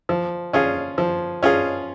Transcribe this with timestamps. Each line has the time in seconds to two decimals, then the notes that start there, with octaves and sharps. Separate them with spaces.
0.09 F3
0.53 C#4 F4 G#4
0.98 F3
1.43 C#4 F4 G#4